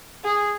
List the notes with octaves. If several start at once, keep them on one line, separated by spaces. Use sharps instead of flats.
G#4